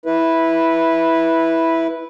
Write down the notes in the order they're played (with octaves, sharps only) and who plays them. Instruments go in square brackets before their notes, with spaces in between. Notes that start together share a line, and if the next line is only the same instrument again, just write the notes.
[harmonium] E4 B4